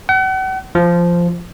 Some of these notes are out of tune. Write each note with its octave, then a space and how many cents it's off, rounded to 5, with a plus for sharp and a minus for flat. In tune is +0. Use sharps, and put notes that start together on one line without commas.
F#5 +40
F3 -10